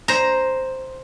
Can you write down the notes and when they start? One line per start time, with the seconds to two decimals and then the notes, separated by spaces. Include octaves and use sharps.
0.08 C5 A#5